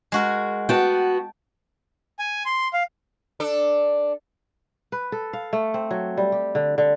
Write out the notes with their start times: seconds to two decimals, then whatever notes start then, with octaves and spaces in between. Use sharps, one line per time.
0.12 G#3 F#4 A#4
0.69 B3 F#4 G5 A5
2.19 G#5
2.46 C6
2.73 F5
3.40 D4 A4
4.92 B4
5.12 A4
5.33 F5
5.53 A3
5.74 C4
5.91 F#3
6.17 G3
6.32 G4
6.55 D3
6.78 D3